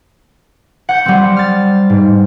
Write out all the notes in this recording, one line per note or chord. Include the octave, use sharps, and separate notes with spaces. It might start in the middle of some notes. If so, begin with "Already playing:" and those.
F#5 G6
G3 C4
F6 A6
G#2